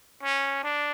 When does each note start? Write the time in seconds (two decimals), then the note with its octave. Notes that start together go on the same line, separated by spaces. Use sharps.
0.23 C#4
0.63 D4